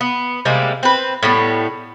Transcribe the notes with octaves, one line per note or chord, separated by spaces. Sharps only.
B3
C3 G3 G#3 A#3
C4 B4
A2 G3 B3